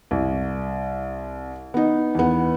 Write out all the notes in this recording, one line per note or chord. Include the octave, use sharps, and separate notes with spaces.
C2
B3 D#4
E2 B3